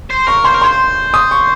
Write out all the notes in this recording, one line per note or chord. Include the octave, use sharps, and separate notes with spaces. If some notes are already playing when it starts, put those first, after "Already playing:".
C5
A#4 C#6
C5 C6
A#4
C5 C6
D#6
C#6